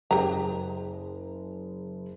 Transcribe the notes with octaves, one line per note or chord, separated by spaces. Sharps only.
F#1 G4 G#4 A#4 A#5